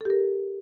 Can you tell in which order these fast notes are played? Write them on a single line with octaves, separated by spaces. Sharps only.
A4 G4 A#4